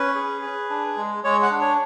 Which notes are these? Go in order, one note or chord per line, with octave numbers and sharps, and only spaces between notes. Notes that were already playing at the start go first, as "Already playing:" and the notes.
Already playing: C#4 B4
G#4
G#4
D4
G#3
G#3 C#5
F#5
D4
C#5